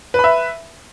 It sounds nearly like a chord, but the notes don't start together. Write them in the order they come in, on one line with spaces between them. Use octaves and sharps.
B4 B5 E5